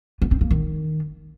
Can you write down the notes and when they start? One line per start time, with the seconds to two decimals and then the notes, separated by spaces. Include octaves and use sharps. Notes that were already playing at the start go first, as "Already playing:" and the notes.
0.22 B3
0.31 C4
0.41 A#3
0.51 D#3